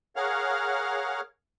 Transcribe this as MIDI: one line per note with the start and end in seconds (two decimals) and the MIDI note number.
0.16 1.21 68
0.16 1.21 70
0.16 1.21 73
0.16 1.21 77
0.16 1.21 78
0.16 1.21 89